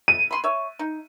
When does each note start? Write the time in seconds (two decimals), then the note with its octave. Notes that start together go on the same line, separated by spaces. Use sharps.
0.08 D#7
0.31 B5 C6
0.44 C#5 E5
0.79 D#4